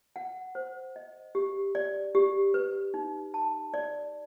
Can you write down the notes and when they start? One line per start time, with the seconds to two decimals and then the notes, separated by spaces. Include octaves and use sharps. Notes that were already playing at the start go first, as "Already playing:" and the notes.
0.16 F#5
0.55 C5
0.96 D#5
1.35 G4
1.75 D5
2.15 G4
2.54 B4
2.94 D#4
3.34 A5
3.74 D5